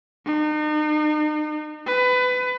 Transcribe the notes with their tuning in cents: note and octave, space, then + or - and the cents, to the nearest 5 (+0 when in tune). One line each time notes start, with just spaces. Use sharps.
D#4 -40
B4 +25